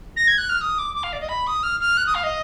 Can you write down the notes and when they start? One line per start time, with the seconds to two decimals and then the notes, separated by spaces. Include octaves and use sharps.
0.16 A#6
0.27 G#6
0.38 F#6
0.49 F6
0.61 D#6
0.79 D6
0.95 D6
1.03 F5
1.13 D5
1.21 D#5
1.29 B5
1.47 D#6
1.63 F6
1.80 F6
1.97 F#6
2.07 D#6
2.15 F5
2.24 D#5